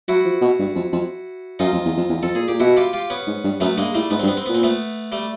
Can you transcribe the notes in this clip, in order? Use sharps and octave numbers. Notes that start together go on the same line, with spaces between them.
F#3 E4 F#4
F3
B2
G2
F2
F2
F#2 D#4 F4
F2
E2
F2
E2
F2 A4
A#2 G#4
A#2 G4
B2 E4 F#4
F4 G4
F4 G4
B3 C#4
G#2
G2
F#2 A3 B3
G2 G#3 A#3
A2 G3 A3
G#2 B3
G2 C4
B3
C4
A#2 B3
C4
A3 B3
G3 A3